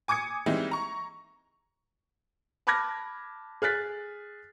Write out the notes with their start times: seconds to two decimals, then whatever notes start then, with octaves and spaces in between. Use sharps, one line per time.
0.08 G#5 D6 D#6 G#6 C#7
0.46 E3 G3 G#3 C4 D#4 E4
0.71 A#5 C#6
2.67 A5 B5 D6 F6 G#6 A#6
3.62 G#4 F6 F#6 A6 B6